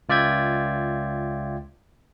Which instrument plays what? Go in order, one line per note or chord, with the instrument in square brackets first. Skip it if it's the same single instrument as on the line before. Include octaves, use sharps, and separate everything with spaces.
[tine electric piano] C#2 F4 D5 E5 G5 G#6